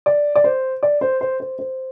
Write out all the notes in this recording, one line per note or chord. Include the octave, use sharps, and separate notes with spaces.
D5
D5
C5
D5
C5
C5
C5
C5